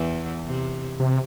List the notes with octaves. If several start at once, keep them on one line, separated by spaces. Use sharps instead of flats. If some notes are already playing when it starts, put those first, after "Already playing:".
Already playing: E2 E3
C3
C3